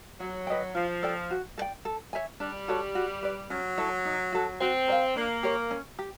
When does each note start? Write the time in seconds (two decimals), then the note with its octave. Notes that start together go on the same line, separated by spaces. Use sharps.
0.20 F#3 F#4
0.47 B4 D#5 G5
0.75 F3 F4
1.03 A4 D5 G5
1.31 F#4
1.58 A4 D5 G5
1.85 A4
2.13 C#5 E5 G#5
2.40 G3 D4
2.68 F#4 A4 C#5
2.95 F#4
3.23 B4 D5
3.50 F#3 C#4
3.78 E4 A4 C#5
4.05 D#4
4.32 F#4 A4
4.60 C4 F#4
4.88 A#4 D5
4.92 F5
5.16 A#3 D4
5.43 G4 A#4 C#5
5.71 C#4
5.99 G4